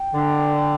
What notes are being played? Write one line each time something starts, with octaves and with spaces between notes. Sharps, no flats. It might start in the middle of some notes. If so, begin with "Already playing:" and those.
Already playing: G5
D3